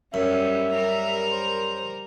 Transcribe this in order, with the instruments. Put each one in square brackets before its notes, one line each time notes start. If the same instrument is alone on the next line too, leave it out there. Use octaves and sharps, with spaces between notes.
[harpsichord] F#2 [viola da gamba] G3 C#4 [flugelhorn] E5
[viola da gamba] G3 A#4
[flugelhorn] C5